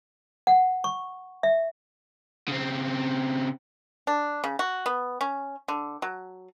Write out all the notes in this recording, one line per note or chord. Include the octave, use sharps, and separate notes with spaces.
F#5
C#6
E5
C#3 C4
D4
C#3
F#4
B3
C#4
D3
F#3